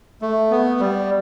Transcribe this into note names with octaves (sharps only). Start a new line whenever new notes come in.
A3
B3
G3